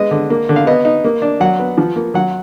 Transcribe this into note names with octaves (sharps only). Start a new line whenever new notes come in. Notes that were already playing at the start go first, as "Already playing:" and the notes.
Already playing: G#3 B3 D#5
D3
A#3
D3
F5
B3 D#5
D#4
A#3
D4
F#3 F#5
B3
F3
A#3
F#3 F#5